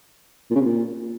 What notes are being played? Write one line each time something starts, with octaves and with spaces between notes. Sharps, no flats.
A#2
C#3
C3
A#2